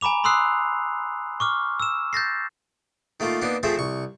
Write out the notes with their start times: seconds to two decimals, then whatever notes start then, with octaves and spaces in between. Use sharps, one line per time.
0.01 G#5 A#5 B5 D6 F7
0.24 B5 C6 D#6 E6 F#6 C7
1.40 C#6 D6 F6
1.80 E6 E7
2.13 G6 A6 A#6 C7
3.20 D#3 A3 A#3 F4
3.42 A#3 B3 D4 D#4
3.63 F3 A3 C4 G#4 E5
3.78 C2 C#6